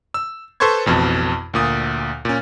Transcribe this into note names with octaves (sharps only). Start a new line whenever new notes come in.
E6
A4 B4 C5 C6 C#6 G#6
A1 F2 B2
D2 A#2 D#6
A#2 C#4